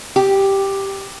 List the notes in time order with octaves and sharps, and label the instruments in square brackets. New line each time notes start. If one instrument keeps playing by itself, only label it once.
[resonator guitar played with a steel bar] G4